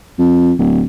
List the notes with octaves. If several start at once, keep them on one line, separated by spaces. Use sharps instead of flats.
F2
D1